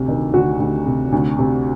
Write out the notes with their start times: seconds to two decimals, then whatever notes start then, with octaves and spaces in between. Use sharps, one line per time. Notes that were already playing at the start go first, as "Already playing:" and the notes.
Already playing: D2 C3
0.08 D#3
0.33 D2 F#4
0.60 D2
0.86 C3
1.12 D2
1.39 C3